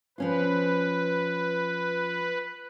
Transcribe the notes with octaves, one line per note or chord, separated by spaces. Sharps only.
F3 C#4 F4 B4